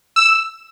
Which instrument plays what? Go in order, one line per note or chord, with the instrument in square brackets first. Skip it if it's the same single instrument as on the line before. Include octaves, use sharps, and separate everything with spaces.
[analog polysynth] E6